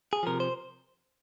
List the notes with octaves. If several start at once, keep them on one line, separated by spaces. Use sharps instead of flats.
G#4
C3 F3 A#4
C5